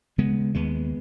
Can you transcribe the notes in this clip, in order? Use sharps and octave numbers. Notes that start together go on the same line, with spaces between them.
C#3 G#3 B3
D#2 G#3 B3